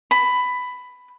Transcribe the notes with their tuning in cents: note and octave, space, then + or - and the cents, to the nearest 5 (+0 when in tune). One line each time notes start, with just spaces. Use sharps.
B5 +10